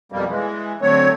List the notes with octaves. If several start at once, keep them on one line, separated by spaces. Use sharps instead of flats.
F2 B2 G3 A#3
E3 G#3
D3 F#3 A3 C4 C#5